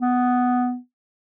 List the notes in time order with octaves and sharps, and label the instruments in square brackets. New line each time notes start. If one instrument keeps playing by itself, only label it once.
[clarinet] B3